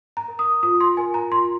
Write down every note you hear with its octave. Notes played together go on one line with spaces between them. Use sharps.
A#5
A#4
D#6
F4 D#6
C6
A#4 G#5
A#5
F4 C6